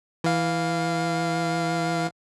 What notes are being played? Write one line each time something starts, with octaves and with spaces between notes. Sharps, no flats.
E3 F5